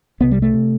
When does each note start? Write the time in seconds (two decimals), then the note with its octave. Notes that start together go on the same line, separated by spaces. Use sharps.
0.20 C2 C3 B3
0.31 G3
0.42 A3
0.53 C3